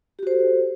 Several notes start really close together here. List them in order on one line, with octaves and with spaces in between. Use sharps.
G4 F#4 C5 A4